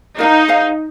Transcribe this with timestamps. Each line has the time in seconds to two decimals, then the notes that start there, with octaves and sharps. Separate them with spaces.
0.19 D#4 A#4 F5 A#5
0.48 G#4 C5 F5 G#5